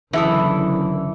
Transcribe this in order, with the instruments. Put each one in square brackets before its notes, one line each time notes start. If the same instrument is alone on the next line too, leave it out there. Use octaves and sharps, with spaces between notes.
[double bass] F#1 D3 [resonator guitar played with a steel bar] E3 [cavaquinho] E4 A4 D#6